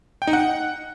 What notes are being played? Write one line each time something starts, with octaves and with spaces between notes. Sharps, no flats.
G5
D#4
F#5